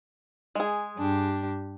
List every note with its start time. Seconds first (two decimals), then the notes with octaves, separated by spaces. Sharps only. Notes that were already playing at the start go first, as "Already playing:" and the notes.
0.55 G#3 G#4
0.98 G2 D4 G4